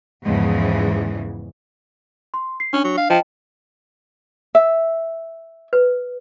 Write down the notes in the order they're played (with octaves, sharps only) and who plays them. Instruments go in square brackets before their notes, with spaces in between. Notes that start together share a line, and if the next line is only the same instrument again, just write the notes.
[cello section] E2 G#2 C#3 E3 F3 G#3
[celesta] C6
C7
[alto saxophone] C#4 [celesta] D4
[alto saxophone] F#3
F5
[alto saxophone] F3 [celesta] D#5 G5 A5
[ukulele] E5
[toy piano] B4